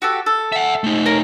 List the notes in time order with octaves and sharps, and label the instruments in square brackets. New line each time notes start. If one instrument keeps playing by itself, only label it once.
[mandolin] F#4 G4 A4
A4
[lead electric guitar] E5 F#5
A3 D#4
[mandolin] A#4 C#5